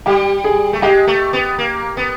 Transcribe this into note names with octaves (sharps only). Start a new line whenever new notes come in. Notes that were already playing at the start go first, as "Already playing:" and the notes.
G3 G4
G#4
A3
G#3 G4
A3
B3
A#3
B3